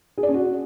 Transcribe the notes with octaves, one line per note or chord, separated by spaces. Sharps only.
G#4
D5
C#4
F#4